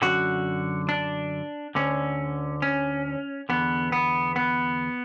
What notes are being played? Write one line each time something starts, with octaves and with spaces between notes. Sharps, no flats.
F#2 D3 F#4
D4
D2 D3 C#4
C#4
E2 D3 B3
B3
B3